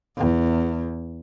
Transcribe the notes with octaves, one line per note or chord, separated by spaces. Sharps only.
E2